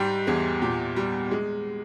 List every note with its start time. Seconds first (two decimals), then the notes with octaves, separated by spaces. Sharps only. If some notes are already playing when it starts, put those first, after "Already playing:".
Already playing: G#2 G3 G4
0.27 E2 G#4
0.62 A#2 G4
0.96 G3
1.31 G#3